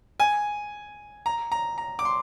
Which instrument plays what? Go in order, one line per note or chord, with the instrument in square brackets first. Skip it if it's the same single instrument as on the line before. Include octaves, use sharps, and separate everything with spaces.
[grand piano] G#5
A#5
A#5
A#5
D6
C6